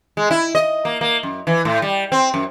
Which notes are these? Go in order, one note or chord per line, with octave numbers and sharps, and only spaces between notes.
G#3
E4
D#5
A#3
A#3
F#2
E3
A2
G3
C4
F#2